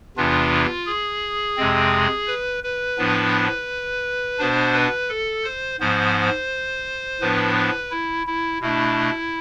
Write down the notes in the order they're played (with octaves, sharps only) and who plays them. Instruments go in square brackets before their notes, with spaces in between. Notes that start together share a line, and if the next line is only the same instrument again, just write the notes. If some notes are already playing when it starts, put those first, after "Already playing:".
[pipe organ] E2 C3 E3 B3 D4 F4
G#4
F2 C3 G#3 C4
B4
B4
A2 F3 B3 D4
B2 B3 D4 C5
B4
A4
C5
G#2 F3 B3 C5
A2 F3 B3 D4 B4
B4
E4
E4
B2 A3 D4 E4